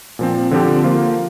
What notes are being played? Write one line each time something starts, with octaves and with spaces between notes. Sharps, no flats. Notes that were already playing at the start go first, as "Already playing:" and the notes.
A#2 F3 C4
D3 F3 C4 G4
F3 A#3 F4